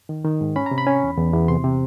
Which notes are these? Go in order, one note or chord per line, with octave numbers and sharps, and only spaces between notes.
D#3
D#3
G#2
C#4 B5
A#5
C3
B5
C#4
E2
E2
E2
C3 C6
C3